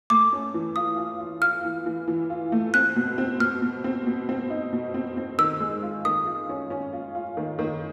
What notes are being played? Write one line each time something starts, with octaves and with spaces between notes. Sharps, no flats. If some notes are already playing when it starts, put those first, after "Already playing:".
A3 D6
C#4
E3
F4 D#6
F4
F4
F4 F6
E3
E3
E3
F4
A3
C4 F#6
B2
C4
B2 F6
B2
C4
B2
C4
D#4
B2
C4
C4
D#3 E6
G#3
F4
D#3 D#6
F4
C#4
C#4
F4
F4
D#3
D#3